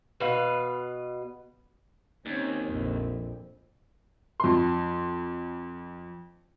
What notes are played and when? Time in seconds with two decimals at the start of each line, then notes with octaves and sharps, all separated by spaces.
0.20 B2 B4 F5
2.26 D#2 C4 C#4
2.68 A#1 F2
4.40 F2 C6